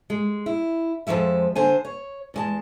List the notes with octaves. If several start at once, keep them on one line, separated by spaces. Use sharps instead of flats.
G#3
E4
F2 C#3 F3 G#3 E5
D3 C5 G#5
C#5
E2 G#3 A5